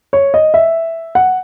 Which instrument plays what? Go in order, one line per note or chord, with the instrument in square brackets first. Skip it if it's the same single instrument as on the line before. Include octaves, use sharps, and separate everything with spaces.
[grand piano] C#5
D#5
E5
F#5